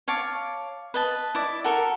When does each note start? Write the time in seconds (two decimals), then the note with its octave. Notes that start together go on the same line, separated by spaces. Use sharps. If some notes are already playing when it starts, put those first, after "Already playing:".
0.08 C#5 F5 A5 D6
0.94 B4 D#5 A5
1.35 E4 D5
1.64 F#4 A4 A#4